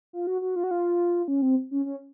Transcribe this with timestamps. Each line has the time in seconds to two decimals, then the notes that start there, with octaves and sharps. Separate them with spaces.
0.13 F4
0.27 F#4
0.42 F#4
0.56 F4
0.64 F#4
0.71 F4
1.28 C#4
1.42 C4
1.71 C#4
1.86 C#4